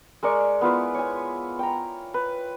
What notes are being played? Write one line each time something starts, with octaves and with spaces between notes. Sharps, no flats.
G#3 A#4 D5 C#6
B3 E4 F4 B4
C#5 G#5
G5 A#5
B4